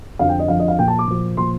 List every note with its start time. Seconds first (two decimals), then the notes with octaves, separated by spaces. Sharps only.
0.19 F2 D3 F3 F5
0.29 G5
0.39 D#5
0.48 F2 D3 F3 F5
0.59 D#5
0.68 F5
0.79 A#2 F3 G5
0.88 A5
0.99 D6
1.07 A#2 F3
1.37 A#2 F3 C6